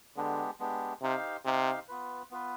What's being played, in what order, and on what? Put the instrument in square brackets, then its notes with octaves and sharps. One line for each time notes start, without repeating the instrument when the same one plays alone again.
[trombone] D3 [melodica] G#3 B3 D4 G4
[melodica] G#3 B3 D4 G4
[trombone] C3 [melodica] D#4 G4 C5 F5
[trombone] C3 [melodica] D#4 G4 C5 F5
[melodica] B3 F4 B4
B3 F4 B4